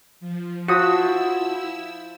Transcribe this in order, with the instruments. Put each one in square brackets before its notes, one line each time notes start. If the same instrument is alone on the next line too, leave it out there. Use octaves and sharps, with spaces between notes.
[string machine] F3
[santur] F3 D#6 [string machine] E4 E6 [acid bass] F#4